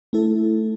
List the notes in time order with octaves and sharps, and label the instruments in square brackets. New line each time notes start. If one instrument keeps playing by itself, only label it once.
[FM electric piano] A3 E4 A4